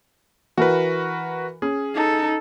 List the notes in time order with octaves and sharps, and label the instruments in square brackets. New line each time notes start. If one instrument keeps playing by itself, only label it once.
[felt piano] E3 [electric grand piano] F#4 A#4 B4
[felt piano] C#4 [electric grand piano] G#4
[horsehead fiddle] D#4 A4